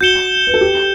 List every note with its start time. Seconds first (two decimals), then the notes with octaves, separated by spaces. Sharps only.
0.01 F#4 G6 C#7 E7 G7
0.47 B4
0.54 A4
0.61 G4